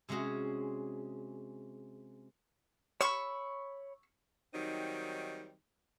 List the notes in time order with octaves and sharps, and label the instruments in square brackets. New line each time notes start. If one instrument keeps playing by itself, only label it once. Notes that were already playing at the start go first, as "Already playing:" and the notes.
[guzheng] C3 G#3 C#4 F#4 G#4
[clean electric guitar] C#5 B5 [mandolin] C#6 E6
[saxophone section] D#3 F#3 G3 C4 D#4